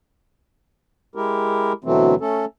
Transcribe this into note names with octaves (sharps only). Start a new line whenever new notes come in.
G#3 E4 G4 A#4
D2 B2 E3 F#3 A3 C4
A3 C#4 A4